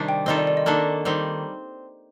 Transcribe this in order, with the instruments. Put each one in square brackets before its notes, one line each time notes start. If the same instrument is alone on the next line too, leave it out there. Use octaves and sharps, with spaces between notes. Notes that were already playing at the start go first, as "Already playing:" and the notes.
Already playing: [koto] C3 D#3 G3 D4
[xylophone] G5
[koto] D#3 G3 C4 F4 A4 [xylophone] D#5
[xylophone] D5
D5
D#5
[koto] D#3 A#3 D4 A4 [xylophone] D5
[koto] D#3 G3 C4